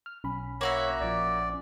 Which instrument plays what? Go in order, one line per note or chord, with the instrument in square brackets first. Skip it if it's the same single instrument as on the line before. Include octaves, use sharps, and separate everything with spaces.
[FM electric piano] F6
[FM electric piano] B1 B5 [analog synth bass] C#4
[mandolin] A#3 F#4 E5 [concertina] C#5
[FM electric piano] A#1 F3 [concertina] D5